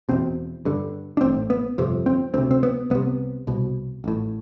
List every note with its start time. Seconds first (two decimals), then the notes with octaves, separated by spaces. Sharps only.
0.09 E1 E2 B2 C4
0.65 G1 G2 D3
1.17 D4
1.21 A1 A2 C4
1.50 B3
1.78 G1 F2 C3
2.06 C4
2.34 D2 C3 C4
2.51 C4
2.63 B3
2.90 C2 C3 B3
3.47 C2 B2
4.04 A1 A2